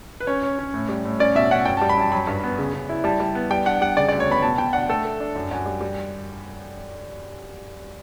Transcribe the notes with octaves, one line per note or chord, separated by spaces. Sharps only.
B4
C#4 C#5
C#4
C#4
A2
G3
A2
C#4 D5
B2 E5
C#4 F#5
F#2 G5
G3 A5
B5
F#2 A5
F#3 B5
G2
B3
C#3
C#3
E4
G3 A5
G3
B3
G3 G5
D4 F#5
G3 F#5
C#3 D5
D2 D5
C#5
B3 B5
B2 A5
B2 G5
D4 F#5
A3 A4
A3
D4
F#2
F#2
G3
G3